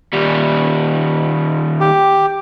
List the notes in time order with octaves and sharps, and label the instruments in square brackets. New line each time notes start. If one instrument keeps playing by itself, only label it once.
[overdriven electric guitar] D#2 G3
[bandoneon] G4